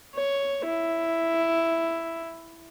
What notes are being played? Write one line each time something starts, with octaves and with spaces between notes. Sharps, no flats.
C#5
E4